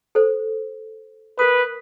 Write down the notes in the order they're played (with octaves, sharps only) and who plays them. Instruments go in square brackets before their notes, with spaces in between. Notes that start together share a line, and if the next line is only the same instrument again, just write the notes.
[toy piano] A4 C5
[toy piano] A#4 D#6 [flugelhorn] B4